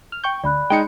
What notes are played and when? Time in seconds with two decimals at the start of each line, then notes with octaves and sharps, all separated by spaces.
0.12 F6
0.24 G5 C#6 G6
0.44 D2 D5 B5 F#6
0.70 G#3 D#4 G5 C#7